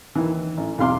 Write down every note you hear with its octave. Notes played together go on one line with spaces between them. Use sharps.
D#2 E3
A1
B1 E2 C3 F5 C6 D6